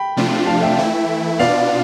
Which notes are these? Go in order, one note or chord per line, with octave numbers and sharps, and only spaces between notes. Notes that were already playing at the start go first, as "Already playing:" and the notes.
Already playing: G5 B5
C3 F3 A3 D4 F4
F5 A5
E5 G5
E3 A3 E4
B2 B3 D4 F4 D5 F5